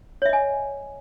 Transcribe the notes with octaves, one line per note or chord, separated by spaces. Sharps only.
C#5 D#5 E5 G#5